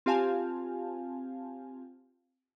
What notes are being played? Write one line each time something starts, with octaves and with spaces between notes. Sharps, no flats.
C4 F4 G4 F5 G#5 A5